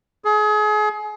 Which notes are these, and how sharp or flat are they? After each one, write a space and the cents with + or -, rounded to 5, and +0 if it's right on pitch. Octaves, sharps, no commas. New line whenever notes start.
G#4 +30